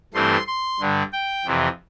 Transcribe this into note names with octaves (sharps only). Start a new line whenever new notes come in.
G2 E3 A3 C4 C6
C6
G2 D3 G3
G5
F2 C3 E3